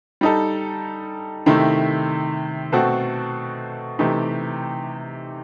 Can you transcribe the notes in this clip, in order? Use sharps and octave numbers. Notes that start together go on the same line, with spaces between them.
G3 D#4 A4
C3 D#3 A3 E4
B2 A3 C4 F#4 A4
C3 E3 A3 D#4 G4